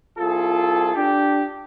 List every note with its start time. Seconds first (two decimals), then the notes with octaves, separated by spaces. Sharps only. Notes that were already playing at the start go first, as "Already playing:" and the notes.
0.18 C2 F4 G#4 A4
0.95 D4 G4